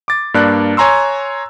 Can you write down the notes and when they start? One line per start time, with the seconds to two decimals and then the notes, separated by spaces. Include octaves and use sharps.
0.08 D6 A6
0.34 G2 A#3 D4 D5 F#6
0.77 C#5 G#5 A#5 C6 E6